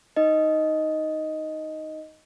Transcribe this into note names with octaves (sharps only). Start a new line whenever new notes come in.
D#4 D#5